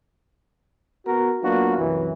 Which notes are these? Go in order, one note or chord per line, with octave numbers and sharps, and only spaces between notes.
B3 F#4 A#4
F#3 A#3 B3 D4 F4 F#4
C2 F#2 E3